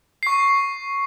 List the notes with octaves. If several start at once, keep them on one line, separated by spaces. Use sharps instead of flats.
C#6 C7